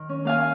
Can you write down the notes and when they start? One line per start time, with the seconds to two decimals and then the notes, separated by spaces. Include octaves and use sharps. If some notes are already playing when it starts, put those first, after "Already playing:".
Already playing: D#3
0.09 C#4
0.25 A#3 F5 G#5